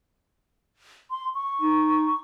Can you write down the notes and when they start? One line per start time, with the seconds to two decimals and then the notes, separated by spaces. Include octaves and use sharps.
1.11 C6
1.35 C#6
1.61 D#4